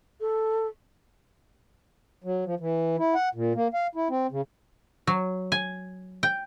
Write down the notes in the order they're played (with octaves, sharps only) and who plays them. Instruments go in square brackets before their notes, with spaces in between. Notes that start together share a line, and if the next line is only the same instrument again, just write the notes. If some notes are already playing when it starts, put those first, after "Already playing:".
[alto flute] A4
[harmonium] F#3
F3
E3
E4
F#5
A#2
A#3
F5
E4
C4
C#3
[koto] F#3
G#5
G5